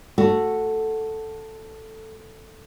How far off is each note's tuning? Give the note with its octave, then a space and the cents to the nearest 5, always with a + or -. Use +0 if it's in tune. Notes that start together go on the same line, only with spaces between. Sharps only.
A3 +0 F#4 +0